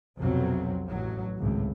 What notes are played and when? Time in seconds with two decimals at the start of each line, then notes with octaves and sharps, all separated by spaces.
0.19 B1 F2 C3 F#3 C4
0.87 A1 F#3
1.38 G#1 C#2 A2